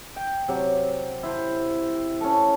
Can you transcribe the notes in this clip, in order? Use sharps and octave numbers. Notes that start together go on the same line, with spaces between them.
G5
C3 F#3
E4 C5
C#4 A4